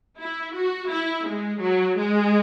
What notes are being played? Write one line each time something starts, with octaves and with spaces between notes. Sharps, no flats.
E4
F#4
E4
G#3
F#3
G#3